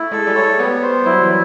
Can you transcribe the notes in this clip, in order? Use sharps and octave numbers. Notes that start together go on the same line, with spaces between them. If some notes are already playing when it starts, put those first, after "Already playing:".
Already playing: A3 E4
G#3 A4
G3
C#5
G#3
G3 B3
C5
F#3 E4
E3